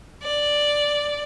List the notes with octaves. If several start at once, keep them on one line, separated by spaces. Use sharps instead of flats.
D5